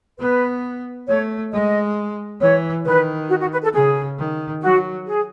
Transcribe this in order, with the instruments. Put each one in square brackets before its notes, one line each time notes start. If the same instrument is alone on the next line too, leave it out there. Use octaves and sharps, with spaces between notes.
[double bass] B3 [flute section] B4
[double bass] A3 [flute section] C#5
[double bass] G#3 [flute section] D#5
[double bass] E3 [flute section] C#5
[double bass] D#3 [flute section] B4
[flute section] F#4
F#4
B4
A4
[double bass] C#3 [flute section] G#4
[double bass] D#3
[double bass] F#3 [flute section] F#4
[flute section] G#4